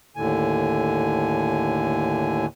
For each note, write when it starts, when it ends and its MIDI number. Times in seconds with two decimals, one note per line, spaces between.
0.16 2.46 39
0.16 2.46 45
0.16 2.46 50
0.16 2.46 80